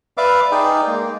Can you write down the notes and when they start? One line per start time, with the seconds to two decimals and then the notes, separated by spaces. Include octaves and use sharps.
0.17 B4 D5 E5 F5 D6
0.52 D#4 G#4 D5 G5
0.87 G#3 A#3